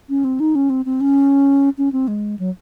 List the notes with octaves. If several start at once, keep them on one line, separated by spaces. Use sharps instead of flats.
C#4
C4
D#4
C#4
C4
C4
C#4
C#4
C4
G#3
F#3